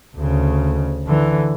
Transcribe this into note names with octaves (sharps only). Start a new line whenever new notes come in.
D2 C#3
D3 E3